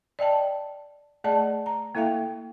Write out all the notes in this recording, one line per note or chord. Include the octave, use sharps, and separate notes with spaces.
D5 D#5 G5 A5
A3 G#4 D5 D#5 A5
A#5
A#3 E4 A4 E5 F5 G5